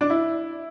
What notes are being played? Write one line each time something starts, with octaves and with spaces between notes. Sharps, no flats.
D4
E4